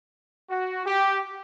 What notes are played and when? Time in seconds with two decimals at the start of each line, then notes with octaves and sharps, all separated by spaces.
0.49 F#4
0.86 G4